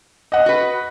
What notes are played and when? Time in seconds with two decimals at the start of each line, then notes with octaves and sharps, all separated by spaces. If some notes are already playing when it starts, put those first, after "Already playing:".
0.32 D#5 F#5
0.46 F#4 B4